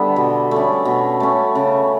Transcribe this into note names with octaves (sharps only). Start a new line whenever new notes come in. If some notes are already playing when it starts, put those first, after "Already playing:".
Already playing: D3 G3 B3 A4 B4 D5 E5
B2
A3 C#4
B2
A3 C#4
C#3